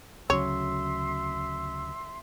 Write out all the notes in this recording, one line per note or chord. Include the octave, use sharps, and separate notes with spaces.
D2 C#3 F#3 C#5 E5 C6 E6